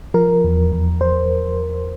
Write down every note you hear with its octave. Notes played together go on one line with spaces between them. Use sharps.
F3 A#4
E2
E2
E2 C5